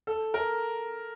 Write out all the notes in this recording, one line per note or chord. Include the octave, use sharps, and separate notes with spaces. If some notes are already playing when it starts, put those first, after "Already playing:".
A4
A#4